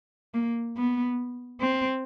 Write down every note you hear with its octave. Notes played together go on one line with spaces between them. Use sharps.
A#3
B3
C4